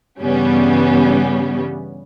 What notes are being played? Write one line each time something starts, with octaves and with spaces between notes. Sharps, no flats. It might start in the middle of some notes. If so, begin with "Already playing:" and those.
G2 C#3 E3 G3 B3 C#4